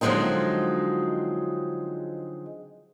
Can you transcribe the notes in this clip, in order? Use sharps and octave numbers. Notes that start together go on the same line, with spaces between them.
D3 F3 F#3 G#3 C4 D#4